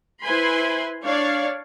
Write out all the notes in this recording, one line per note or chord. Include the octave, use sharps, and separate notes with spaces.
E4 B4 C5 G#5 B5 C6
D4 C#5 D5 F5